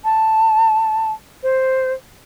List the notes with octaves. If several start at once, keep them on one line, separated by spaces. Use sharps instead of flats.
A5
C5